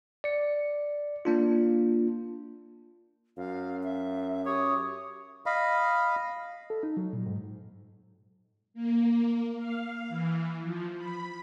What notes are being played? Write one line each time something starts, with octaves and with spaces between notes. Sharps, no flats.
D5 C#7
A#3 D4 F4
F#2 F5
E5
G4 C#5 D#6
D#5 F5 B5
A4
D#4
F#3
A#2
G#2
A#3
F5
E3
F3
B5